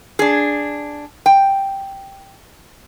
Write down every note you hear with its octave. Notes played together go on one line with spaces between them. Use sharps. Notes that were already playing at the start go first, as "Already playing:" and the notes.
D4 G#4
G5